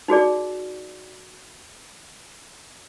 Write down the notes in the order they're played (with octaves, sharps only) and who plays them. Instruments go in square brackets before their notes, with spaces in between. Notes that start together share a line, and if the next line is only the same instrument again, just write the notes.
[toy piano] D#4 F#4 G#4 D5